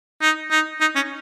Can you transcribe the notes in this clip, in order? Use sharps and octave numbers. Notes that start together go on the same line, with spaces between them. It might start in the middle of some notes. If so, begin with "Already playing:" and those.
D#4
D#4
D#4
C#4